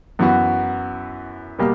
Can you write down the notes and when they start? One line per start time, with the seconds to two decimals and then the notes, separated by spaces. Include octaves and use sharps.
0.19 F#2 E3 B3 F#4
1.59 B2 G3 A#3